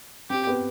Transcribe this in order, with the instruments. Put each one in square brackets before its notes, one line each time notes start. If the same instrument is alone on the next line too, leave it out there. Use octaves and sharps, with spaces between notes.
[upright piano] C4 [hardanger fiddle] G4
[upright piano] B3